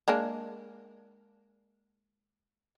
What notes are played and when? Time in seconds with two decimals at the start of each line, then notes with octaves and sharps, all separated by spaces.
0.08 G#3 A#3 D4